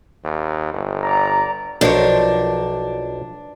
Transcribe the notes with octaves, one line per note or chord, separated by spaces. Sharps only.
D#2
G1
D5 A#5
B1 F3 D4 A#4 C5 C#5